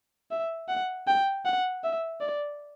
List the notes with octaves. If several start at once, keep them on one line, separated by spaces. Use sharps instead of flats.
E5
F#5
G5
F#5
E5
D5